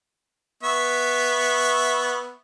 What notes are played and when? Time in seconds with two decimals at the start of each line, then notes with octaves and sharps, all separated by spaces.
0.63 B3 E5 C#6